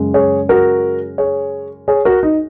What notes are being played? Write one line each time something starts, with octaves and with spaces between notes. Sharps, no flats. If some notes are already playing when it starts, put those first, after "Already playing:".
Already playing: F#2 C#3 G#3
G#4 C#5
F#4 A#4
G#4 C#5
G#4 C#5
F#4 A#4
D#4